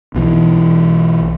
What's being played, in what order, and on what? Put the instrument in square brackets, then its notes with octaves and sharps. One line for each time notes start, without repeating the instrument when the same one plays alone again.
[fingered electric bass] B1 B2 D3 E3